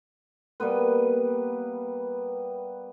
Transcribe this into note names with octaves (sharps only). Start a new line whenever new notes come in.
G3 A#3 B3 B4